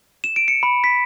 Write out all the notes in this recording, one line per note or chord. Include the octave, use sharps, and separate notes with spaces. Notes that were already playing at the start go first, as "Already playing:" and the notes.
E7
D7
C#7
B5
B6